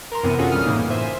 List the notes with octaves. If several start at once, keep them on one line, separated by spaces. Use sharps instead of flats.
A#4 A#5 C6
F#2 C3 E3 B3 A#4 D#7
C#4 F4 F#4 G#4 A4
A#1 F#2 G3 D#6 F6
A2 C#3 E3 A#3 D#4
C5 E5 G#5